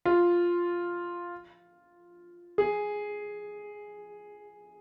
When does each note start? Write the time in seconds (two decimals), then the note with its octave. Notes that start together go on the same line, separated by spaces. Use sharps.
0.05 F4
2.58 G#4